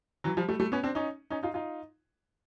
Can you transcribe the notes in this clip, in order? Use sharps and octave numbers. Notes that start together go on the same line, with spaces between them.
E3 F#3
F3 G3
G3 A3
G3 A3
B3 C#4
C4 D4
C#4 D#4
C#4 D#4
D#4 F4
D#4 F4